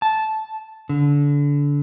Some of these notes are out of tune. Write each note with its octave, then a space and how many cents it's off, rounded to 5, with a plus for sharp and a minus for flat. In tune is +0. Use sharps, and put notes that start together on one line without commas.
A5 -10
D3 -25